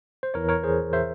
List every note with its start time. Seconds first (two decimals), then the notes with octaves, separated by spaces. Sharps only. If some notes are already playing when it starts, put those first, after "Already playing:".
0.23 C5
0.34 E2 E3 A#4 C#5
0.49 A#4 C#5
0.63 G#4 C5
0.93 C5 E5